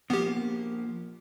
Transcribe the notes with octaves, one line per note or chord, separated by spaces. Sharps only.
F3 A#3 B3 G4